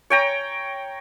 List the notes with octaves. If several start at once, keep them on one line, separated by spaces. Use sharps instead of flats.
C#5 G5 A#5